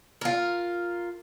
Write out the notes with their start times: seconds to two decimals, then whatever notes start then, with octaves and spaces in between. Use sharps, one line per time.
0.21 F4 A#4